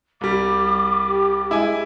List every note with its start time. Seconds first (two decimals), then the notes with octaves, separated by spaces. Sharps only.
0.21 C2 G3 D6
1.09 G4
1.51 G#3 E4 G#5